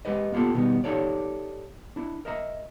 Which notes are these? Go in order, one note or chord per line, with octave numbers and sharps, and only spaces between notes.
G#3 G4 B4 D#5
A#3 B3 F4 G4 A4
B2 D#3 G3 B3 D#4
D#4 G4 A4 C#5 D5
D4 E4
A#4 D#5 E5 A#5